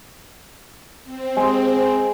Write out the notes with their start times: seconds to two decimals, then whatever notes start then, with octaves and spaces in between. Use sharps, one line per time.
1.04 C4
1.37 G#3